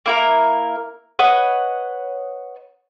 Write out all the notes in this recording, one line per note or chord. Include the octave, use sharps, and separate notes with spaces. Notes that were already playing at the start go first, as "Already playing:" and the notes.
A#3 E4 A#4
B4 C#5 D#5 F#5